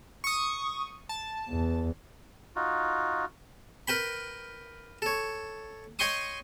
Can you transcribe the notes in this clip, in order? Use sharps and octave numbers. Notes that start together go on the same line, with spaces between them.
C#6 D#6
A5
E2
D#4 F4 F#4
A#4 B4 G5 B5
A4 C#5
C#5 D#5 G5 C6 C#6 D#6